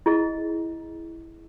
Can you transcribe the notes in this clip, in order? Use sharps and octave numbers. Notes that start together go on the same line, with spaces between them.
E4 G#4 D#5